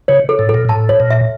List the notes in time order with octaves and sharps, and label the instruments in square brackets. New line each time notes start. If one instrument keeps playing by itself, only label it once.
[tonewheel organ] C#3 [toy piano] C#5
[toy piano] A4
[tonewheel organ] A2
[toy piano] A4
[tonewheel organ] A#2
[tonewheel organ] A2 [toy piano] A5
[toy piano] C#5
[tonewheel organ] A#2
[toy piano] E5